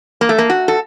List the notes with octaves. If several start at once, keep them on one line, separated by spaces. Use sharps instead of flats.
A#3
A3
A#3
F#4
A4